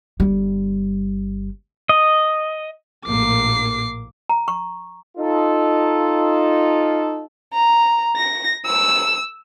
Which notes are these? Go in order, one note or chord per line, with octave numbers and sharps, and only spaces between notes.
G1 G3
D#5
A#1 A2 A#3 D6 C7
A#5
C#6
D#4 F4 A4
A#5
A#6
E6